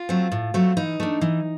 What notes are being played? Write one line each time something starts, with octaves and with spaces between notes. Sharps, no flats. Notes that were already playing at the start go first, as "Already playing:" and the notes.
Already playing: F4
F#3 A3 C4
A2
F#3 A3 C4
E3 D#4
A3 D4
E3